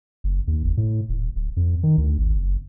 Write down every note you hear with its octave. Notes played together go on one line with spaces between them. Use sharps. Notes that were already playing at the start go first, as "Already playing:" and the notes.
F#1
D#2
F#1
A2
D#1
D1
F2
D#3
D2
G#1
F#1